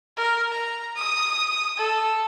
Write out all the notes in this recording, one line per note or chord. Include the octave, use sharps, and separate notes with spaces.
A#4
A#5
D#6
A4